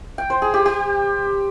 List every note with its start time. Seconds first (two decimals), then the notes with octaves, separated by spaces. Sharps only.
0.18 G5
0.30 C5
0.42 G#4
0.54 G4
0.66 G4